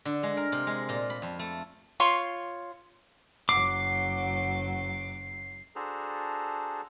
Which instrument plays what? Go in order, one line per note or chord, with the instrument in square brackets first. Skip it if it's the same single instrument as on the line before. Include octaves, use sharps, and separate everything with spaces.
[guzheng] D3
G#3
A#4
C3
G#3
A#2
B5
F2
A3
[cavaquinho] F4 C#5 C6
[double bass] F#1 F#3 [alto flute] F#5 [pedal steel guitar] D6 [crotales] C7
[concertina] D4 F#4 G#4 A4 C5 A#5